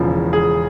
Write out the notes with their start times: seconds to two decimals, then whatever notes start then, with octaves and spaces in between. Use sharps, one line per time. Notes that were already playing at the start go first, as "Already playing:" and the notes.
Already playing: E1 E2 C#3 F3
0.33 G#4